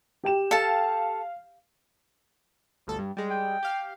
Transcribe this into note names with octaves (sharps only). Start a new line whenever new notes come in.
G4 G5 E7
A4 F5 A5
G1 D2 A4
G2
G3 G#3
G5
G4 F5